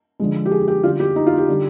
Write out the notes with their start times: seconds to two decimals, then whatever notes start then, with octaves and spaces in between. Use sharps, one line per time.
0.20 D3 F3 G#3
0.46 G4
0.52 G#4
0.68 G4
0.83 D3 G3 F4
1.00 G4
1.16 D#4
1.27 F4
1.38 G4
1.48 D3 G3